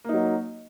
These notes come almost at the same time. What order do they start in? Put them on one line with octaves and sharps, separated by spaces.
A#3 D#4 F#3